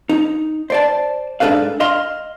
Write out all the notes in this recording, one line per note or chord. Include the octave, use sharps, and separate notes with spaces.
D#4
C5 D5 A5
G#2 E3 D4 A4 B4 F5
D#5 F5 C6